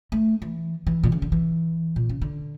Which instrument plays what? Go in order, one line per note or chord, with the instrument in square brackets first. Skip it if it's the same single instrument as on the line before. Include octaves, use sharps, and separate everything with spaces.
[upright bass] A3
E3
E3
A#2
C#3
D3
E3
A#2
C#3
D3